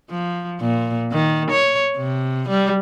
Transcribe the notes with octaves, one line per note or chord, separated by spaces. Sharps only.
F3
A#2
D#3
C#5
C3
G3